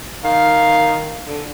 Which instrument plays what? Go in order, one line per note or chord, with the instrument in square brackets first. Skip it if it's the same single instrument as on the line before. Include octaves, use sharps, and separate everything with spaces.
[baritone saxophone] D#3 [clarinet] F5
[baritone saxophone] D3